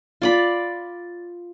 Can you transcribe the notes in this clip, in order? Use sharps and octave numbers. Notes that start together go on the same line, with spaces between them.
F4 D5 B5